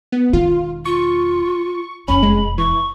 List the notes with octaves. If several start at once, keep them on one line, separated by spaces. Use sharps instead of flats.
B3
E1 D#3 F4
F4 C#6
E1 F2 C#4 B5
G#3
E3 C#6